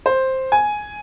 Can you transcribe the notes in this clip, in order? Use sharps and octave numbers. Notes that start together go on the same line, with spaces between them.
C5
G#5